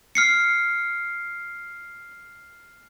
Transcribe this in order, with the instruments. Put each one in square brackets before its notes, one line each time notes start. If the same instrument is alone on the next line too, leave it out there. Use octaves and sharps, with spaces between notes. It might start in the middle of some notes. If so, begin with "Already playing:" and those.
[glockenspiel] F6 C7 C#7